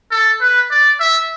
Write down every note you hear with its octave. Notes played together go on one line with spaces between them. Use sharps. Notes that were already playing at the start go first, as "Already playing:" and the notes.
A4
B4
D5
E5